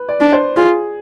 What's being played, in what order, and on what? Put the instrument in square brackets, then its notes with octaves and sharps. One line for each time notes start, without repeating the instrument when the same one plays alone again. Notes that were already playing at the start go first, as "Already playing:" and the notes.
Already playing: [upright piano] B4
D5
[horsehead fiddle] D4
[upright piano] C5
[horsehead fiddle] F4 [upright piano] G#4